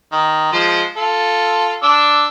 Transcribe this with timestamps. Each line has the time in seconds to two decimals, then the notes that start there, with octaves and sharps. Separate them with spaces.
0.12 D#3
0.53 F3 G#3 C5
0.96 F4 A4
1.83 D4 D6 E6